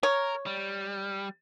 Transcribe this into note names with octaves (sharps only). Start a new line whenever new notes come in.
A#4 C#5
G3